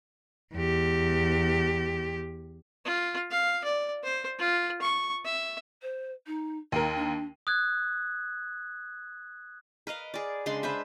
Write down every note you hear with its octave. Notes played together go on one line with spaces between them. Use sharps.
E2 G4
F4
F5
D5
C5
F4
C#6
E5
C5
D#4
D#2 D#4 A#4
D4
D#6 F#6 G#6
A#4 B4 D#5 F5
G#4 D5
C#3 G#3 D4 C6
B4 C5 E5